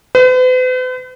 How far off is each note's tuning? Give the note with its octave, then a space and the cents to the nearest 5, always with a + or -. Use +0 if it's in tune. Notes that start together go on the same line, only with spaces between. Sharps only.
B4 +45